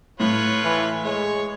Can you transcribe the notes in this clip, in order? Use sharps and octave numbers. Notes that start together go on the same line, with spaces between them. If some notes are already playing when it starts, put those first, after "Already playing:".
A2 F4 B4 C#5
E3
G#3 C#5